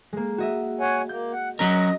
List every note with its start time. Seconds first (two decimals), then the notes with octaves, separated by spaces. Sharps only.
0.13 G#3 A#3
0.38 F#4 D#5 E5
0.80 C#5 F#5 G#5
1.09 A#3 G6
1.33 F#5
1.59 F#3 C#4 A#4 D#5